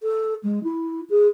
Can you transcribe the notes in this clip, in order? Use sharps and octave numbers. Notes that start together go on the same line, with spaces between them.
A4
G#3
E4
G#4